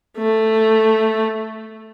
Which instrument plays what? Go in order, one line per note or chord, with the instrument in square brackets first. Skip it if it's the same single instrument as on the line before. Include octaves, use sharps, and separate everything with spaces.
[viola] A3